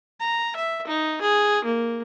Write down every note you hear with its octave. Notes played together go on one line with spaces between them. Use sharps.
A#5
E5
D#4
G#4
A#3